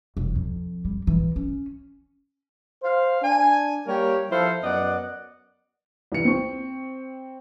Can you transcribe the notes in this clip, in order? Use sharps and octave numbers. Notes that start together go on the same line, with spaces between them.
F1
F2
G3
E3
C#4
C5 F5
D4 G#5
G3 A#3 G4 A#4 C#5
F3 E4 A4 C5 F5
F#2 B3 D5 D#5 F#5
C2 E3 C#7
C4 C#6